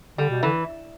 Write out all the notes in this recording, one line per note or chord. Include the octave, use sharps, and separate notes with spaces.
D3 G3
B2
D3 E3